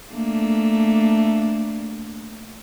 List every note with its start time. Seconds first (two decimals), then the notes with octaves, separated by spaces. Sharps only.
0.11 A3 A#3 D4